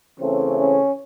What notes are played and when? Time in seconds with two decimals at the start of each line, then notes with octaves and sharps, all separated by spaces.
0.20 C#3 E3 A3 C4 C#4
0.57 C#4